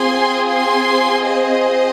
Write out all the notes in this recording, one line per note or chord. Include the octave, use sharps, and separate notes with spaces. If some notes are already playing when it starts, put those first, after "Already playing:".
Already playing: C4 F4 G#4 G#5 C6
G#5 C6
C5 D#5